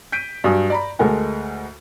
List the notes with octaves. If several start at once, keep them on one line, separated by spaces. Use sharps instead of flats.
G6 B6 D7 D#7
G2 F#3 F#4 G#5 D#6
D5 A#5 B5
D2 G#3 A4 A#4 F#5 G#5